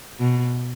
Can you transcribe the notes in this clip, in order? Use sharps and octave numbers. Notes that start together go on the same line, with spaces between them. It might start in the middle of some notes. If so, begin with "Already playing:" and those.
B2